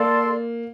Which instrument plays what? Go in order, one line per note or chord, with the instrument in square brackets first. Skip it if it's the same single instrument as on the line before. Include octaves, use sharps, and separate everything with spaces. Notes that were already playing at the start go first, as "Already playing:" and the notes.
Already playing: [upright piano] A#3 [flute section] A4 D5 F5 C6